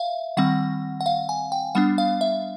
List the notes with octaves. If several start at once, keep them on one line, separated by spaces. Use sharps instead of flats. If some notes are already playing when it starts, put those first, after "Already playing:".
Already playing: E5 F5
D#3 G3 C4 F#5
F#5
F5
G#5
G5
G3 B3 D4 F#5
F5
E5